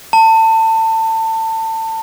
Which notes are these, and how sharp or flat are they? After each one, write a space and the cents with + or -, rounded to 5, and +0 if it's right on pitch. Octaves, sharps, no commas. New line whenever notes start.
A5 +25